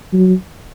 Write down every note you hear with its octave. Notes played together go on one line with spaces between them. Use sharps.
F#3